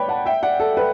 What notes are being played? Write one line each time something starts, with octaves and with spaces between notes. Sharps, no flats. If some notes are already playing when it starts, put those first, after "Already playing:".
Already playing: B4 C#5 D5 G5 B5
F#5 A5
E5 G5
D5 F#5
A4
B4